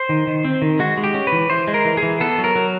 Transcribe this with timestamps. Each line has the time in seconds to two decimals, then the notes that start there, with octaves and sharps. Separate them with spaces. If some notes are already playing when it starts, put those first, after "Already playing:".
Already playing: C5
0.09 D#3
0.27 D#3
0.45 C4
0.62 D#3
0.79 G#3 F#4
0.97 G#3
1.04 G4
1.14 C#4
1.27 B4
1.32 E3
1.50 E3 C5
1.68 G#3
1.74 A#4
1.85 E3
1.97 G#4
2.03 E3
2.20 B3 A4
2.38 F#3
2.44 A#4
2.56 F#3